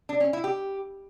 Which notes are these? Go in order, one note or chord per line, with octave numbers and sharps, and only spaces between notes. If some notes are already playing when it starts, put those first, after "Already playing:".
D4
C#4
E4
G4